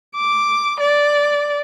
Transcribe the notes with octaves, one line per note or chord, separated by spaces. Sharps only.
D6
D5